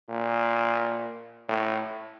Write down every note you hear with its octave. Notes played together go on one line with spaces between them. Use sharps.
A#2
A2